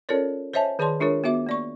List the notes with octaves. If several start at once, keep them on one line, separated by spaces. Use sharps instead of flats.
C#4 F4 A4 A#4 C#5 D5
C5 C#5 D#5 E5 G#5 A5
D#3 G#4 C#5 D5 A5 C6
G#3 D4 F4 G#4 A#4 C#5
B3 F#4 E5 D6
A#3 D5 C#6